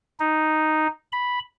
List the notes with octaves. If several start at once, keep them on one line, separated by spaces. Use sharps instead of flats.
D#4
B5